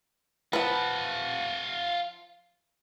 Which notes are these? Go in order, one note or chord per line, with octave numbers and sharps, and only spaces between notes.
F3 F4 B4 F#5